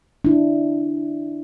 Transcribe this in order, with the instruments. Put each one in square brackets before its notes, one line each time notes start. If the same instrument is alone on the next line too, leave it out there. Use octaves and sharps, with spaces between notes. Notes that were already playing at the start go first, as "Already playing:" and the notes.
[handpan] D4 E4